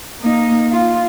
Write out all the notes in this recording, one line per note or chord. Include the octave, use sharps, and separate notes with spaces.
A#3 D#4
F4